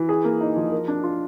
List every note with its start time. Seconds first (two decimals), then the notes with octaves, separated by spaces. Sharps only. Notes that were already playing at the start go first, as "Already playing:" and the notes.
Already playing: E3
0.09 G#4
0.24 A#3
0.41 D#4
0.56 F3
0.72 A#4
0.88 D4
1.04 F4